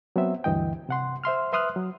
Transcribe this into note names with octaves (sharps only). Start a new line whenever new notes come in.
F#3 B3 C4 E5
D2 G2 E3 D#5 G5
C3 F#5 C6
C5 E5 C6 F6
B4 E5 C6 D#6 F6 F#6
F#3